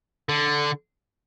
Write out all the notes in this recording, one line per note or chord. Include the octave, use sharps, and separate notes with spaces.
D3